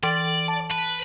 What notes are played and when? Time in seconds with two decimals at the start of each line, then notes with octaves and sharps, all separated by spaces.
0.03 E3 D5 D7 F#7
0.48 A5
0.71 B4